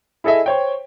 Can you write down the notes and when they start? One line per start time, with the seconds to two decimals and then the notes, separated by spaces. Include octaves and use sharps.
0.24 E4 G#4 A4 D#5 E5
0.46 C5 C#5 G5